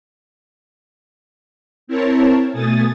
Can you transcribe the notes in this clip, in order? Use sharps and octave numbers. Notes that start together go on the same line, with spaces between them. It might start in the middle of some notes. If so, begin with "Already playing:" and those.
C4 E4 A#4 C#5 A5
B2 A3 G#5 D#6 A6